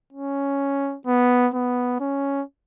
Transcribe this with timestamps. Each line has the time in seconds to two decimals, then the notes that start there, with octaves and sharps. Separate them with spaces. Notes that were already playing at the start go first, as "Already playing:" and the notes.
0.13 C#4
1.07 B3
1.54 B3
2.00 C#4